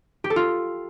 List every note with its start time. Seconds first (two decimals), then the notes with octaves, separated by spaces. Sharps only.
0.24 G4
0.30 A4
0.36 F4